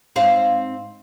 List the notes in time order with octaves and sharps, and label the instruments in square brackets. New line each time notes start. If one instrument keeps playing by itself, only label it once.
[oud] G#2 C4 F5